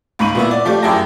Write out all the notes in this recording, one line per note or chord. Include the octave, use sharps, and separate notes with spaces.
C#2 G#2 B5 C#6 D#7 F#7
A#2 B3 E4
D5
F3 A3 G4 D5 D6
F#2 E4 G#4 G5 A5 A#6